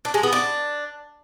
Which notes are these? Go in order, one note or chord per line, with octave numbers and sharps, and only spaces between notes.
D4
G#3
B3
D4